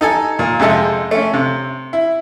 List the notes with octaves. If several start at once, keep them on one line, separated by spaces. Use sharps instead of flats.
D#4 A4 G#5
A#2
F2 C3 G#3 A4 E5
A3 C#4
C3
E4